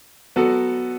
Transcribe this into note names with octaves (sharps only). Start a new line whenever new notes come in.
F#3 B3 F#4 A4